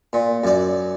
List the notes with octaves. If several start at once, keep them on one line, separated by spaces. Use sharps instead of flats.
A#2
F#2 D5